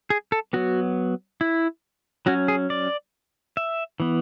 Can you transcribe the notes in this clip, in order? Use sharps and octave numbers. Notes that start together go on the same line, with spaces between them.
G#4
A4
F#3 B3 F#4
E4
F#3 C#4 F#4
G#4
D5
E5
E3 B3